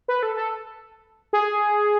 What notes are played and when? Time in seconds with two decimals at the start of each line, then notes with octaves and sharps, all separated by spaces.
0.08 B4
0.23 A4
0.36 A4
1.33 G#4